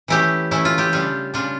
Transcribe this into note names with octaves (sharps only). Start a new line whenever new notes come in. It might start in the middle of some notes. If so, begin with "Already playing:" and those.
E3 A3 C#4 E4 G4
E3 A3 C#4 E4
F4
E4 G4
C#3 G3 D4 F4
C#3 G3 D4 F4